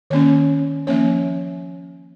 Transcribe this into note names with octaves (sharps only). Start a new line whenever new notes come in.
D#3 A#3 C#4 C#5
F3 A#3 C#4 C#5